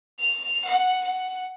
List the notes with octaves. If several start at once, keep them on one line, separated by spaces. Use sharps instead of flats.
F7
F#5
F#5